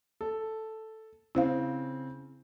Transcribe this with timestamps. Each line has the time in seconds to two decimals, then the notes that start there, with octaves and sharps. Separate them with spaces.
0.21 A4
1.35 C#3 C4 E4 C5 F5